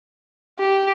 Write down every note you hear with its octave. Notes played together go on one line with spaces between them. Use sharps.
G4